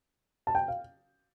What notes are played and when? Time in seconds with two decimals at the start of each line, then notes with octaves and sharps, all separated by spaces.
0.47 A5
0.55 G5
0.68 F5